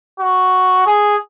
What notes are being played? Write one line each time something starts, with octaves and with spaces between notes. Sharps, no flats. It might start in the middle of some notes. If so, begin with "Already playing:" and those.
F#4
G#4